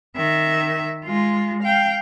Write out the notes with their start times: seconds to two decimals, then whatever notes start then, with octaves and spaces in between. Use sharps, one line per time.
0.16 D#3 E5
1.05 G#3 F4
1.63 F5 G5